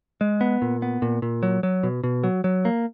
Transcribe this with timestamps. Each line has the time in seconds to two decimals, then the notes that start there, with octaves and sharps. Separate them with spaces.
0.21 G#3
0.41 B3
0.62 A#2
0.82 B3
1.02 A#2
1.22 A#2
1.43 F#3
1.63 F#3
1.83 B2
2.04 B2
2.24 F#3
2.44 F#3
2.65 A#3